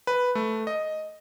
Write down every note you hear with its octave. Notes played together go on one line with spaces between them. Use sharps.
B4
A3
D#5